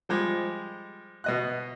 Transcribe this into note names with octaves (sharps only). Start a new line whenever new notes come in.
F3 G3 G#3
B2 D#5 F#6